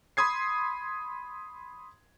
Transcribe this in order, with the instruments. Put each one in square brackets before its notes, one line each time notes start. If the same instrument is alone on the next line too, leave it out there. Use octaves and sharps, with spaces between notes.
[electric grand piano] B5 C6 D#6 G#6 C7